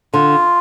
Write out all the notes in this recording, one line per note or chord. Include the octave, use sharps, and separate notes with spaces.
D3 F4